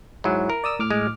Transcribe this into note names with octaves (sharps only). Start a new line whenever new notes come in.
G#2 F#3 E4
A#4
D5 D#6 E6
A2 D6 F6
G#3